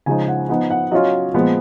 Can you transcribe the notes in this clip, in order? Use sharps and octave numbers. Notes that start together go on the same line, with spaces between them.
C#3 F3 G#3 D#4 G#5
F#5
F3 B3 D#4 F#5
F#5
F#3 C#4 F4 D#5
A#2 F3 G#3 B3